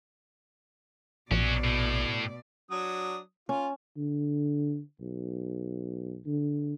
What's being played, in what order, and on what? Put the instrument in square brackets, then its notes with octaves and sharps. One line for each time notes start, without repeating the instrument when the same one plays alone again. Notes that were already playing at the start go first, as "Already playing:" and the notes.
[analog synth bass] A#1 [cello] B2 D5 [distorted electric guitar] C#4 F#4
[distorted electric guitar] A2
[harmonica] F#3 D4 D#6
[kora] C#4 [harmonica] F4
[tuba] D3
B1
D3